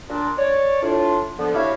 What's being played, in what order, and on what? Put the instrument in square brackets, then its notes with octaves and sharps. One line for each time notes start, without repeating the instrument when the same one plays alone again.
[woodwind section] A#2 D4
C#5 D5
A2 D4 F4
D3 F3 B3
D4 E4 F#4 G4 C#5 F5